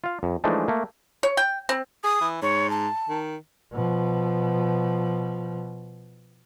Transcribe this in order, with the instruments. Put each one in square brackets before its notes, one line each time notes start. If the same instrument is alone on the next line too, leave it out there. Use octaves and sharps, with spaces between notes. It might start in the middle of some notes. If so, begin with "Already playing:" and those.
[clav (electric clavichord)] F4 F5
F2
E3 F3 G#3 A3 D4 D#4
A3 A#3
[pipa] C#5
G5
C4
[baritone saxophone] G#4 [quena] D#6
[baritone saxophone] E3
[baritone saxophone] G#2 [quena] C#5
[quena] A5
[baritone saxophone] D#3
[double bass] B2 F3